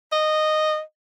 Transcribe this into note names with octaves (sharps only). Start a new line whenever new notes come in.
D#5